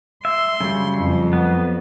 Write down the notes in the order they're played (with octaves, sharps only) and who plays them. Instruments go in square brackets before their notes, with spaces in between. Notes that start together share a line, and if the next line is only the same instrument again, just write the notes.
[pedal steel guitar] E5 [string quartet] C6
[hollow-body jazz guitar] F#2 G3 [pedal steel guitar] C#3
[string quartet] F2
[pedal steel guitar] B3